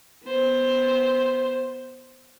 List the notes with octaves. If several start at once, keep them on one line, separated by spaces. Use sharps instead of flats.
B3 C5